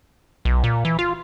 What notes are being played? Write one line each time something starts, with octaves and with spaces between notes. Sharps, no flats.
B1
A#2
E3
F4